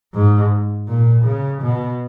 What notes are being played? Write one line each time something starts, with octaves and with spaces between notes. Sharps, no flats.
G#2
A#2
C#3
B2